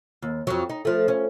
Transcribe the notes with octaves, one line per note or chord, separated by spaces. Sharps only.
D#2
F2 F#3
D#4
F3 A3
C#4